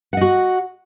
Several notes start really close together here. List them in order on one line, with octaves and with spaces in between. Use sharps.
F#5 D#5 F#4